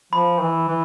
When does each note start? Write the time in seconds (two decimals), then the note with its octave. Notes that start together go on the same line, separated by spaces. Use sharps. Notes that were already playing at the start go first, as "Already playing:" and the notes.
0.13 F3 B5
0.41 E3
0.68 E3